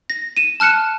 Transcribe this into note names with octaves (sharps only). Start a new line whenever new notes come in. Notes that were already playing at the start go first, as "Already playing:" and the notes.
A#6
D#7 E7
A5 F6 F#6 C#7 E7